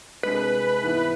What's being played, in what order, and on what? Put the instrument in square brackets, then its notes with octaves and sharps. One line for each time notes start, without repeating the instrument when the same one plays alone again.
[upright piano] C2 C3 G#3 D4 [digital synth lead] B4
[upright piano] G#2 E3 B3 E4